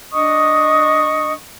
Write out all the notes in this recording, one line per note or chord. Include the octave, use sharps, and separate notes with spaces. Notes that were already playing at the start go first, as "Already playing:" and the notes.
D4 D#5 C#6 D#6